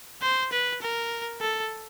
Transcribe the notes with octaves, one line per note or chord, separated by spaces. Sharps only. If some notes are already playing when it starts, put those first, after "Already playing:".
C5
B4
A#4
A4